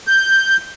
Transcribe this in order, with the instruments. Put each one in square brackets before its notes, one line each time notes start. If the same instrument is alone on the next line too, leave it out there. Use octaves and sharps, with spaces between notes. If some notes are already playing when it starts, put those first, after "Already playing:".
[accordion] G6